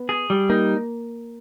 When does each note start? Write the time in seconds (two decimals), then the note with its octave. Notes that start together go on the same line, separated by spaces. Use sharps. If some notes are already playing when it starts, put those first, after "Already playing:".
Already playing: B3
0.09 G#4
0.30 G3
0.50 A#3 D#4